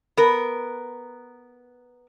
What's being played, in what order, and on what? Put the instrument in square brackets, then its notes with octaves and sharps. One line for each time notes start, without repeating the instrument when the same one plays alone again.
[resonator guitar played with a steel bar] B3 A#4